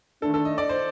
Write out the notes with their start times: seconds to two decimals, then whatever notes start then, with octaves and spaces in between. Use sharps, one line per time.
0.22 D#3 A3 D4 A4
0.34 A4
0.45 D#5
0.58 D5
0.69 C5